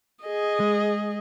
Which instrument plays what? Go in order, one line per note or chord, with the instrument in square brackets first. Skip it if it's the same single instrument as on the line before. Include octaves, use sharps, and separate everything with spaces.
[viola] G#4 D#5
[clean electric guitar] G#3